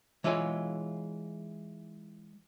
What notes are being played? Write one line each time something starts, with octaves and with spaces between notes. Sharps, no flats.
E3 G#3 E4 F4 C#5 G#5